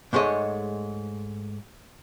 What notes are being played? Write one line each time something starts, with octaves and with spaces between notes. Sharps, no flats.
G#2 G#3 A3 C#5 D#5